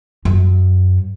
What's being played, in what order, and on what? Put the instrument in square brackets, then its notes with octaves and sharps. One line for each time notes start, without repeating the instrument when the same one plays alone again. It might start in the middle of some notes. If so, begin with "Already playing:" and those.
[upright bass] F#2